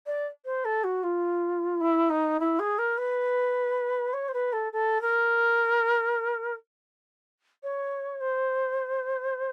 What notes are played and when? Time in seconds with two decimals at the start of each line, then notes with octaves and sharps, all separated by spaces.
0.06 D5
0.45 C5
0.65 A4
0.84 F#4
1.03 F4
1.80 E4
2.10 D#4
2.40 E4
2.59 G#4
2.78 A#4
2.97 B4
4.13 C#5
4.28 C5
4.33 B4
4.53 A4
4.72 A4
5.01 A#4
7.63 C#5
8.20 C5